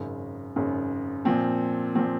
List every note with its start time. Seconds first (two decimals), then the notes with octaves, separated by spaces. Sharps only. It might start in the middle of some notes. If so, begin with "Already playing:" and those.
Already playing: G#1 F#2 C#3
0.56 G#1 F#2 C#3
1.25 A#2 F3 C4
1.95 A#2 F3 C4